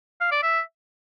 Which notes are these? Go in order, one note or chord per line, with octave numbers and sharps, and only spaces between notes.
F5
D5
E5